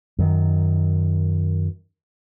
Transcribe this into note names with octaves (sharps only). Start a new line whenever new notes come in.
F#2 D#3